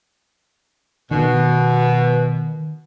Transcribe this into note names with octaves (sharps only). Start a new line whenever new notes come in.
B2 D#3